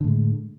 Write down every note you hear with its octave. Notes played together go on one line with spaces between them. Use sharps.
A2 D3 G#3